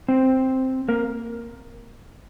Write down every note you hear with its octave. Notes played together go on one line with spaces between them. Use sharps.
C4 C5
A#3 A#4